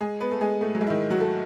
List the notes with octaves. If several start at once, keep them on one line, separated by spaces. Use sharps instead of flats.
G#3 G#4
B3 B4
A3 A4
G#3 G#4
A2 A3
F#3
G#2 G#3
E4
D#3 D#4
F#3 F#4
A3 A4